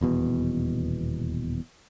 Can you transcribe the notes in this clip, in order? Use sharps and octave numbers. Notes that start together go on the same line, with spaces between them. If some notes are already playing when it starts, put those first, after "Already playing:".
D#1 E2 B2